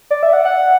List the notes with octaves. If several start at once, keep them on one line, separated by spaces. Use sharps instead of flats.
D5
E5
F#5
F#5